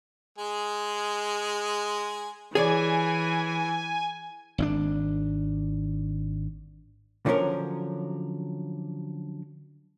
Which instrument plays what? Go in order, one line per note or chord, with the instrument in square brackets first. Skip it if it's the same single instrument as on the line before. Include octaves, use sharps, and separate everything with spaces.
[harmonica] G#3 G#4
[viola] E3 [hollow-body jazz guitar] G#4 C#5 D5 [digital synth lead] G#5
[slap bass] G#1 C4 D4
[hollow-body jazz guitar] D3 F3 F#3 C#4 A#4